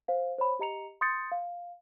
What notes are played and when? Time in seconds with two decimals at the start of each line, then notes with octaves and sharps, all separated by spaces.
0.08 C5 F5
0.38 C5 C#5 B5
0.59 G4 D#5 A#5 C#7 F7
1.01 C6 D#6 G6 A6 C#7
1.32 F5